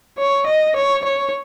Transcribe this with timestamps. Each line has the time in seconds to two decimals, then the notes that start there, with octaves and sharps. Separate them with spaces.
0.18 C#5
0.46 D#5
0.76 C#5
1.05 C#5